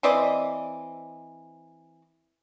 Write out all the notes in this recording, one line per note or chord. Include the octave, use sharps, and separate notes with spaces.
E3 C4 D5 D#5